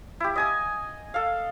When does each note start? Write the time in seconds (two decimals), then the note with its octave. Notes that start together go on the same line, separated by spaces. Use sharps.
0.20 E4 G4
0.36 D#5 G#5 D#6
1.14 A4 F5